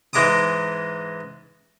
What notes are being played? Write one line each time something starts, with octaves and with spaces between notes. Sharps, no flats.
G#2 E3 G#3 A#5 D6 D#6